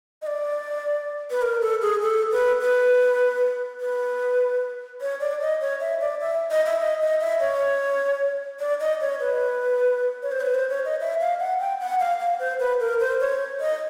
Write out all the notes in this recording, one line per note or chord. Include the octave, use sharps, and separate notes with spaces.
D#5
D5
B4
A#4
A4
G#4
A4
B4
B4
B4
C#5
D5
D#5
C#5
E5
D5
E5
D#5
E5
D#5
D#5
E5
C#5
D5
D#5
C#5
B4
C#5
C5
B4
C5
C#5
D#5
E5
F5
F#5
G5
F#5
F5
F5
C5
B4
A#4
C5
C#5
D#5